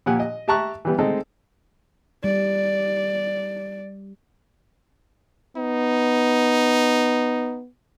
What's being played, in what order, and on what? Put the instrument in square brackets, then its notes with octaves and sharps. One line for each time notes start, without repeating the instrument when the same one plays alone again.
[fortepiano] A#2 F3 G4 F#5 G#5
D#5
G4 E5 A5 A#5 C#6 F#6
E3 G3 B3
G#3 A3 C4 D#4 A4
[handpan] G3 [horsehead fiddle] D5
[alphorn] B3 [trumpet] D#4